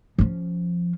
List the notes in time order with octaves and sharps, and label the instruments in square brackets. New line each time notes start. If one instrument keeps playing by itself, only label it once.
[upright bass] F3 C#4